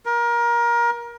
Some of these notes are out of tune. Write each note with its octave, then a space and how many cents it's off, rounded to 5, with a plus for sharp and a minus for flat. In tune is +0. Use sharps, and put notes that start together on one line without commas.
A#4 +25